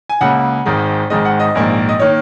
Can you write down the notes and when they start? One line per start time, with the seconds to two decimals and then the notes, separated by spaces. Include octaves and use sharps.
0.09 G#5
0.21 C#2 C#3 A#3 F#5
0.65 G#1 G#2 D#3 G#3
1.10 G#1 G#2 D#3 G#3 D#5
1.25 F#5
1.40 D#5
1.55 A#1 G#2 D#3 A#3
1.89 D#5
2.00 D#3 A#3 C#5